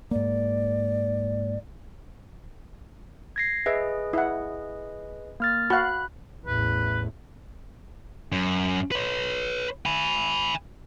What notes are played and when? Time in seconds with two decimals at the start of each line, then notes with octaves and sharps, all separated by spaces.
0.11 G#2 A#3 D5
3.36 G#6 A#6 C7
3.66 G#4 B4 D#5 E5
4.13 E4 F#5
5.40 A#3 F6 A6
5.70 F#4 F5 B5 F#6
6.46 A1 E2 B4
8.32 F#2
8.91 B4 C#5
9.86 G#5 B5